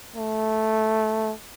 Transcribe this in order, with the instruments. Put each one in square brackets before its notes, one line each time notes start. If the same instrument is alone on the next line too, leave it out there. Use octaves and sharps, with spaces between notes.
[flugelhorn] A3